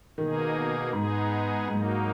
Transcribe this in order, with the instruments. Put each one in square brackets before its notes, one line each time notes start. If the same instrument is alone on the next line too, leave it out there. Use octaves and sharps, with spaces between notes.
[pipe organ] B2 A#3 D#4 G#4 [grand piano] D#3
[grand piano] G#2 [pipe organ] G#3 B3 D#4 G#4
[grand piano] G#2 [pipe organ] F#3 A#3 D#4